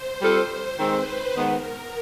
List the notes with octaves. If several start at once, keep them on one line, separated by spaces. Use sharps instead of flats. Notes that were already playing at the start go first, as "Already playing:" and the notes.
Already playing: C5
G3 C4 F4 A4
D#3 G#3 C4 B4
D#3 G#3 B3 A#4
A#4